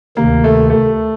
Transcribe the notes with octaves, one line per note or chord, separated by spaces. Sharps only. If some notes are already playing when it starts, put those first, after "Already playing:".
D2 C3 D#3 A#3
A3
A3